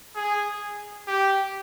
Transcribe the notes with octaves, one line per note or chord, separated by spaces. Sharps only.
G#4
G4